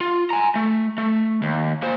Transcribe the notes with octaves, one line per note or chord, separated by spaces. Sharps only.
F4
G#5 A#5
A3
A3
D#2
A#3 C5